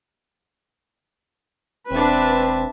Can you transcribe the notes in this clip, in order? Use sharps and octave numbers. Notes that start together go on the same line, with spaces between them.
E1 C4 D4 B4 E5 A5